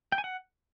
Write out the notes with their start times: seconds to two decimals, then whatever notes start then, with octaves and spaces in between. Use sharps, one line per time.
0.12 G5
0.18 G#5
0.24 F#5